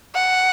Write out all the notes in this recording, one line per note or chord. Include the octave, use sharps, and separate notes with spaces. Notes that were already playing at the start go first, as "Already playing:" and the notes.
F#5